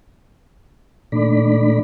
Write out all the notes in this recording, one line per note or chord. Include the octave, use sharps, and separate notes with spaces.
A#2 D#3 A3 D4 D5 B5